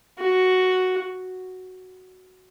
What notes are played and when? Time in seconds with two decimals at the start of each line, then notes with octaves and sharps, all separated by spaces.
0.19 F#4